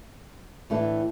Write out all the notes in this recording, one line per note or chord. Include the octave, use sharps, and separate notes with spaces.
A2 E3 A3 D4